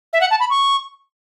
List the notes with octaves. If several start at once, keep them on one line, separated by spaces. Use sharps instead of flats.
E5
F#5
A5
B5
C#6